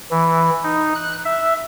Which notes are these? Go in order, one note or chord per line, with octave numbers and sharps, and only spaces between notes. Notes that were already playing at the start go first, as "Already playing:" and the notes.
E3
D#4
F#6
E5